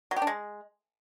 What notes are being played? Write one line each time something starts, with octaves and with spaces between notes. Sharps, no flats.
F#3
G4
D4
G#3